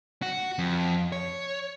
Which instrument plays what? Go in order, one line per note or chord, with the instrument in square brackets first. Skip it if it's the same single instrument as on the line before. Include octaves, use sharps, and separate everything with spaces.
[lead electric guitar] F#4
F2
C#5